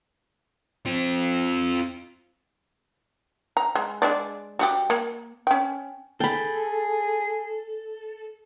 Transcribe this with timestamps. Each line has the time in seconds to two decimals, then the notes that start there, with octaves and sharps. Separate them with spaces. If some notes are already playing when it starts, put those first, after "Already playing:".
0.86 C4 F4
3.57 A#5
3.75 G#3
4.02 G#3 D4 D5
4.59 G3 F#4 G4
4.90 A#3
5.47 C#4 G5
6.20 G#4 A4 G5 B5